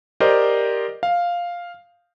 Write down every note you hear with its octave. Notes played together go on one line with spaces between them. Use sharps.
G4 A#4 C5 D5 D#5
F5